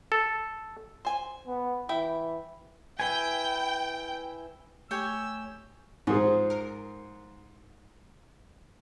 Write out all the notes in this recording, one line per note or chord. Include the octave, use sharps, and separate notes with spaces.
A4
C5 G#5
B3
E3 E4 G5
E4 B4 G5 G#5
A3 G4 C#5 G#5 E6 G6
G#2 F3 G#4
A#4